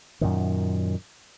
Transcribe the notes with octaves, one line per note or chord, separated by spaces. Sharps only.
F#2 A#2 D#3